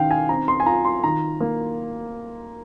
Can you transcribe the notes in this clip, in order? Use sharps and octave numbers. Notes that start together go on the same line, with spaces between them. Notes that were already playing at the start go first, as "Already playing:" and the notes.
Already playing: D#3 C#4 F5 G5
G#5
C4 A#5
C6
G#5
F4 A#5
C6
D#3 A#5
A#3